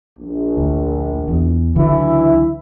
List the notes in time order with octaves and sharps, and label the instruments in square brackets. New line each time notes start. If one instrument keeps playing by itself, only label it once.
[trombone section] A#1
[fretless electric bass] D2
E2
[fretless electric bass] C#2 D3 F#3 [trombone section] E3 E4